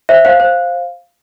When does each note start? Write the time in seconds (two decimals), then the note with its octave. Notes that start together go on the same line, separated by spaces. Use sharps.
0.09 C5 E5
0.25 C5 F5
0.40 C5